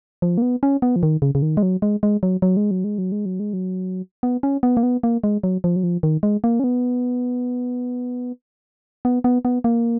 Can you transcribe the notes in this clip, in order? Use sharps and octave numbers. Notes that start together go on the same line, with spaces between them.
F3
A#3
B3
C#4
B3
F3
D#3
C#3
C#3
D#3
G#3
F#3
G#3
G#3
F#3
F#3
G#3
F#3
G#3
F#3
G#3
F#3
G#3
F#3
B3
C#4
B3
A#3
B3
A#3
G#3
F#3
F3
F#3
F3
D#3
G#3
A#3
C#4
B3
B3
B3
B3
A#3